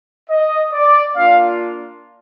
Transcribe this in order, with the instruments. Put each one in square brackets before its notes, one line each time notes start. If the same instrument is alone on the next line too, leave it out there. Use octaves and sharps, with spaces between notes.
[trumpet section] D#5
D5
A#3 D4 F4 F5